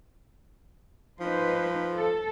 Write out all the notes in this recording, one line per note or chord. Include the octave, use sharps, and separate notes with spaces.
F3 D#4 B4 C5
A4